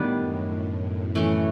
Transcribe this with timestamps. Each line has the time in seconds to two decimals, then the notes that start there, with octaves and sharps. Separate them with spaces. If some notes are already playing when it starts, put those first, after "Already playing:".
Already playing: A2 D#3 G3 B3 D4
0.14 F#2
0.49 F#2
1.15 E3 A3 C#4